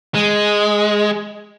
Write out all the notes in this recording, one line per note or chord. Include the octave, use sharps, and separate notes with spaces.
G#3